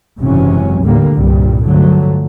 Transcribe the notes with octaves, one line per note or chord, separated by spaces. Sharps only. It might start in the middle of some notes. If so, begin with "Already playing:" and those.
F#1 G#2 C3 E3 F#3 C#4
A1 D#2 A2 D3 G3 A#3
C2 G2 A#2 G3
G2 D3 F3 F#3 A3